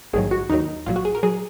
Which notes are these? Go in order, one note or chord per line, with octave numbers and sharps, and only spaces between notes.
A#1 G#2 D#3 F#3 G#4
F#4
D#2 D#3 F#3 D#4
A#1 A#2 F#3 F4
F#4
G#4
A#4
F#3 G#4